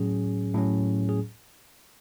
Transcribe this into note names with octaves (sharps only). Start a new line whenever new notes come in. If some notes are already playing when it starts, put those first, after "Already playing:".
Already playing: A2 F#3 C#4 G#4
A2 F#3 C#4
G#4